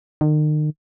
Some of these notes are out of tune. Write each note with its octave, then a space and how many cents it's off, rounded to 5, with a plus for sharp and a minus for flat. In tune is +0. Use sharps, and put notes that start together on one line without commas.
D#3 -40